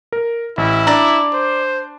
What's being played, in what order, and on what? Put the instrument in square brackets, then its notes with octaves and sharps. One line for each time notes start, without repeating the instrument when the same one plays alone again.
[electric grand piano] A#4
[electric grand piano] A1 [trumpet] E4
[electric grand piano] D4 [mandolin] D5 A#5
[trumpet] C5